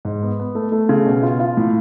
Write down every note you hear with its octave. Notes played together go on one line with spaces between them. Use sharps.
G#2
B3
B3
A3
A3
C#3
B2
F4
F4
A2